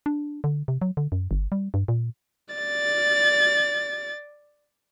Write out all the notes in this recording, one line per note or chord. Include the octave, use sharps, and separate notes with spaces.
D4
D3
C3
F#3
D3
F#2
G1
G3
G2
A#2
D5 A6